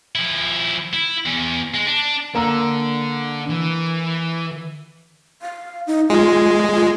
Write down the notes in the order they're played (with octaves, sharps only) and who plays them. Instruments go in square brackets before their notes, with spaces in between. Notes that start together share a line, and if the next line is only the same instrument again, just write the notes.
[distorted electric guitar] F3 E4
E4
E2
G#3
D4
[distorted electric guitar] D3 D4 [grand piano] A#3 A#5 E6
[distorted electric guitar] E3
[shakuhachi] F5
D#4
[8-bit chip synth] G#3 [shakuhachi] F4
[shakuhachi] F4